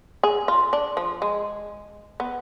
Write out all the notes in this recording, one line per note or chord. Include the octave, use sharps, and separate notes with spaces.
G#4
F4
D4
F3
G#3
B3